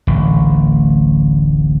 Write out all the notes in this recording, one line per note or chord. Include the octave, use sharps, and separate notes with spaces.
D1 A1